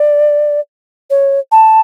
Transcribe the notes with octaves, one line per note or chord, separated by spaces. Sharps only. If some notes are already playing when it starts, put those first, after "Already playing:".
Already playing: D5
C#5
A5